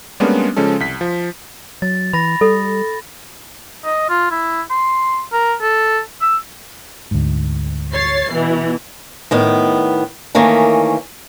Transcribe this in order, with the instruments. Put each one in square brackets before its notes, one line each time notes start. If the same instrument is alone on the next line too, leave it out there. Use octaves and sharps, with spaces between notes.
[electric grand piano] G3 G#3 A#3 B3 C#4 D4
C#3 F3 G#3 C#4 A4
C2 B6
F3
[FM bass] F#3 [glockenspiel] A6
[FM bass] E3 [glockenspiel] B5 A#6
[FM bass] G3 [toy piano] A4
[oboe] D#5
F4
E4
C6
A#4
A4
E6
[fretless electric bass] D2 G#2
[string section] C#5 A6 C7
B2 E3
[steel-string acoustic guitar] A2 D#3 B3
D#3 E3 A3 A#3 C#4